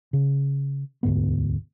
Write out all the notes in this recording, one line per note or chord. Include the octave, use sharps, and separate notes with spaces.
C#3
E1 D2 G#2 B3